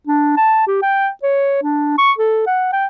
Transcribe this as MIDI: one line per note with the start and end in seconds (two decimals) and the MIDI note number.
0.07 0.32 62
0.37 0.63 81
0.67 0.82 67
0.82 1.09 79
1.23 1.61 73
1.63 1.94 62
1.98 2.12 85
2.18 2.44 69
2.46 2.69 78
2.73 2.86 79